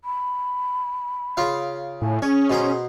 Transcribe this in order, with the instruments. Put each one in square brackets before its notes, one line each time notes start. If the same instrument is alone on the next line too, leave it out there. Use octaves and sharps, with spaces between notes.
[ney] B5
[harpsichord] C#3 F4 F5
[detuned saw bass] A2 [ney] G#5
[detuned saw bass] C#4 [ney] G#4 [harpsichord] C#5
[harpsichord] B2 C5 A#5